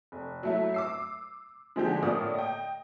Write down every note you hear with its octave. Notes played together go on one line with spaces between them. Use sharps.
F1
F#3 A3 E4
D6 E6 C7
D3 F3 G#3 C4 D#4 G4
A2 A#3 F4 D5 D#6
D#5 G5